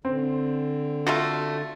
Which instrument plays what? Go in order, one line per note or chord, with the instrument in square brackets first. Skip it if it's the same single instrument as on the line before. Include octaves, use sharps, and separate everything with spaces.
[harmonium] D3 [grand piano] C4
[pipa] A3 F4 F#4